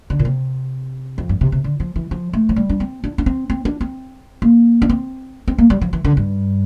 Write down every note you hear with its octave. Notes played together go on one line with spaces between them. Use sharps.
D3
A#2
C3
F2
G2
C3
C3
D3
F3
E3
F3
A3
F3
G3
D4
C4
D4
D4
C4
C4
D4
C4
A#3
D4
C4
C4
A#3
G3
F3
E3
D3
G2